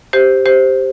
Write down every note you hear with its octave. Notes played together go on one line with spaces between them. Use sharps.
G4 C5
G4 C5